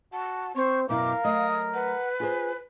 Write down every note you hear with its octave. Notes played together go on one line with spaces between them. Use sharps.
F#4 A5
C4 C5 C#6
F#2 B2 E4 A#4 F5 D6
F#3 A3 D#5 D#6
B4 F#5
F4 G#4 C5 G#5